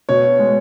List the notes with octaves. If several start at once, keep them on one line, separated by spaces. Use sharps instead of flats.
B2 C#5
G#3